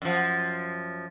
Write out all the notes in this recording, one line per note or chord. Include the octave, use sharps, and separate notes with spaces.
F#2 F3